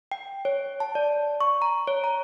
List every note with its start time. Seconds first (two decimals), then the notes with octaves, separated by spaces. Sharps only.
0.12 G5
0.45 C#5
0.80 A5
0.95 D5
1.41 C#6
1.62 A#5
1.87 C#5
2.04 A#5